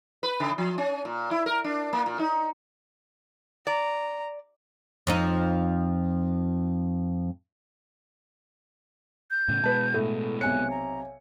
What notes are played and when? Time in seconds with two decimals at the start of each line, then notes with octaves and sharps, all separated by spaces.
0.23 B4
0.40 C#3
0.58 F3
0.78 C#4
1.05 A#2
1.31 E4
1.46 A#4
1.64 D4
1.93 A#3
2.06 A#2
2.19 D#4
3.67 D5 A#5
5.07 F2 F3 D#4
9.31 G6
9.48 A2 C#3
9.64 B2 G#3 B4 A5
9.94 A2 A4
10.41 B1 C3 C#5 G#5 F#6 C#7
10.70 A#5